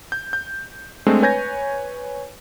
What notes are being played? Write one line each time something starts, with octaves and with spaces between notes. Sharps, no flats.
G6
G6
G#3 A3 C4 D4
B4 C#5 G#5 G6 G#6 A#6